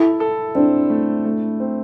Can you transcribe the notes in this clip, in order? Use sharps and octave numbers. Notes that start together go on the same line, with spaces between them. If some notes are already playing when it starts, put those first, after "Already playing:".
Already playing: E4 A4
A4
C4 D4
A3
A3
C4